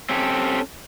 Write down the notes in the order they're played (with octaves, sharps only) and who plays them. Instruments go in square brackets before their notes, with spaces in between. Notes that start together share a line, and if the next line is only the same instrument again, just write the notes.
[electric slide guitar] C4 C#4 G4 A4